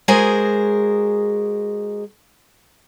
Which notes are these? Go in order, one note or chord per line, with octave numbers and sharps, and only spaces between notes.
G#3 F#4 G#4 A#4 C5 G#5